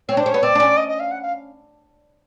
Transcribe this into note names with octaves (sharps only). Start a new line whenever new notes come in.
C4 C#5
D4 C5
C#4
B3 C#5
C4 D5
D4
C#4
D#5
D#5
F5
F#5
F5